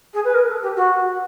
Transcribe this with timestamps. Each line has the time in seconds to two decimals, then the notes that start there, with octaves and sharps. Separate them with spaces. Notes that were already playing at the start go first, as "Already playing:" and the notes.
0.13 G#4
0.24 B4
0.34 A#4
0.49 A4
0.62 G4
0.76 F#4